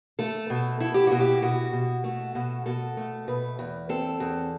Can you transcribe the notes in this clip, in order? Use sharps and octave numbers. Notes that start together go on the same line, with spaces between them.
A3 A4
B2
E4 A4
G4
B2 F#4
G4
B2 F#4
B2
A3 F#4
B2
B2 A4
A3
B2 B4
E2
C4 A4
E2